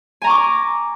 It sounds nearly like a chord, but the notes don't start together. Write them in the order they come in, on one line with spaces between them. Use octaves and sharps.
G#5 A#5 C#6 D6